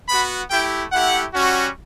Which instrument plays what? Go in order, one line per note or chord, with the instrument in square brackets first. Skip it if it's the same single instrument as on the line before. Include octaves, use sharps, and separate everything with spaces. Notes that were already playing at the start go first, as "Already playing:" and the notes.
[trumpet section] B3 F#4 B5
A3 E4 G4 G5
A3 E4 G4 F#5
G3 C#4 F#4